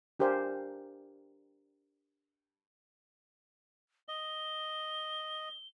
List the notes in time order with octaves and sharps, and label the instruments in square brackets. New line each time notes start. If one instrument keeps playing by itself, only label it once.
[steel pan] D4 G4 A#4 C5 F5 G#5
[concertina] D#5 [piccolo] G7